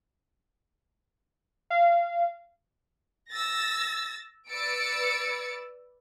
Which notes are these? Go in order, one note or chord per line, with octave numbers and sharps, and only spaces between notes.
F5
E6 A6 A#6
B4 D5 E6 A6 C#7 D7